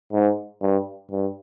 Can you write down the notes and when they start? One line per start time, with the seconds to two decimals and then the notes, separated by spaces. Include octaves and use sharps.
0.13 G#2
0.62 G2
1.11 G2